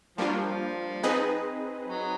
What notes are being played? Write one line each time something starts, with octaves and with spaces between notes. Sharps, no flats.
F3 G3 A#3 D4 F4
F#3
F3
C4 D#4 G#4 B4 D#5
F#3